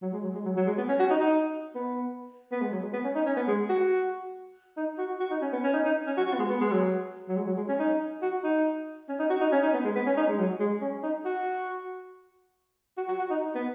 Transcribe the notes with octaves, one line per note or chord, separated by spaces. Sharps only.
F#3
G#3
F#3
G#3
F#3
F#3
G#3
B3
C#4
F#4
D#4
D#4
B3
B3
G#3
F#3
G#3
B3
C#4
D#4
C#4
B3
G#3
F#4
D#4
F#4
F#4
D#4
C#4
B3
C#4
D#4
D#4
C#4
F#4
F#4
B3
G#3
B3
G#3
F#3
F#3
G#3
F#3
G#3
C#4
D#4
F#4
D#4
C#4
D#4
F#4
D#4
C#4
D#4
B3
G#3
B3
C#4
D#4
G#3
F#3
G#3
C#4
D#4
F#4
F#4
F#4
F#4
D#4
D#4
B3